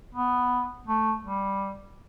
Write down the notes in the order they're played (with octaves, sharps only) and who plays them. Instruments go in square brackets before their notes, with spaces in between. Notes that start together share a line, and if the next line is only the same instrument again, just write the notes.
[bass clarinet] B3
A3
G3